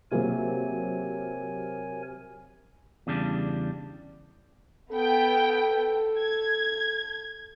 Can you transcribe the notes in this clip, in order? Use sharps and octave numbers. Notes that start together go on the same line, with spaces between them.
C3 F#3 A#3 F4 G#4 A#4 C#5 G#5
E2 C#3 G3 D4
B3 A4 G5
G#6